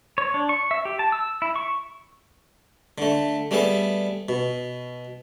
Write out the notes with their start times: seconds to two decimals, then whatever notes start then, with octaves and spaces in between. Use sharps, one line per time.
0.18 C#5
0.34 D4
0.49 C#6
0.71 E5
0.85 G4
0.99 A5
1.12 E6
1.42 E4
1.56 C#6
2.98 D3 A3
3.51 G3 A3 B3 G#4 A4
4.29 B2